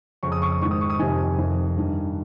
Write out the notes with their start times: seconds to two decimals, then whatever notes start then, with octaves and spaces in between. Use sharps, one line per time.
0.23 F2 C#3 C#6
0.32 D#6
0.42 C#6
0.52 D#6
0.61 G#2 D#3 C#6
0.71 D#6
0.81 C#6
0.90 D#6
0.99 F2 C3 D#3 G#5
1.38 F2 C3 D#3
1.76 G2 D#3